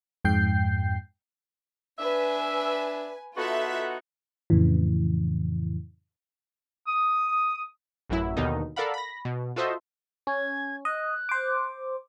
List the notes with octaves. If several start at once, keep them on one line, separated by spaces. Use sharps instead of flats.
F2 G#2 G5 G6 C7
D4 B4 E5 G#5
B3 D#4 F4 F#4 A4 E5
F2 A2 C#3 E3
D#6
A1 F#2 F#3 E4
D#2 B2 D3 D#3 D#4
A4 A#4 D5 F5 F#5 B5
B5 A#6
B2
F4 F#4 A4 C5 D#5 E5
C#4 G#6
D#5 F#6
C5 D6